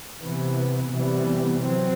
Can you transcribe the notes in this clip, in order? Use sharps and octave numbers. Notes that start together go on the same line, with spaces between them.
C3 E3 B3
C3 E3 G3 B3
F#3 C4